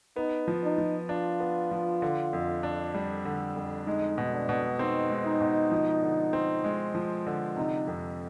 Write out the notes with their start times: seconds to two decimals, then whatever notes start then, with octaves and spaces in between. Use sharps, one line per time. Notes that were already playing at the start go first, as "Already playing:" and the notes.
0.16 B3 D#4
0.48 F3
0.64 D#4
0.78 F3
1.09 D4 F4
1.40 B3
1.71 F3
2.02 D3
2.33 F2
2.63 D4
2.95 G3
3.25 D3
3.56 F2
3.86 G#3 D#4
4.18 B2
4.33 D4
4.49 B2
4.79 C4 D#4
5.10 G#3
5.25 D#4
5.41 B2
5.72 F3
6.03 D3
6.33 C4
6.64 G#3
6.95 F3
7.27 D3
7.57 C3 D#4
7.87 F2